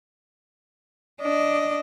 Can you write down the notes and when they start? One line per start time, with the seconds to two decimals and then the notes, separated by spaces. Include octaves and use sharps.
1.21 D4 D#5